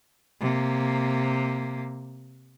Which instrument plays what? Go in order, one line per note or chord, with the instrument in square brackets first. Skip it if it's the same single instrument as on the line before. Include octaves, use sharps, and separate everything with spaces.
[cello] C3 A#3